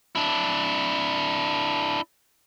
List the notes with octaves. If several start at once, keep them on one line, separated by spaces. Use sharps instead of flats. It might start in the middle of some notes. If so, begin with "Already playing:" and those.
D4 E4